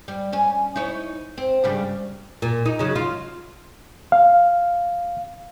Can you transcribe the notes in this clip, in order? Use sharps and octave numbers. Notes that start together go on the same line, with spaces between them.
G3
C#4 G#4
D#4 E4 C#5
C4
G2 C#3 G3
A#2
D#4
C#3 F#3
F4
F5